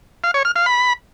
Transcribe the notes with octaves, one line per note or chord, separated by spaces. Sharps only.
F5
C#5
F6
F5
B5